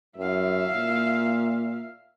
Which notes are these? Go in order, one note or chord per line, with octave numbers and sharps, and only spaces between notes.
F#2 E5 F5
A#2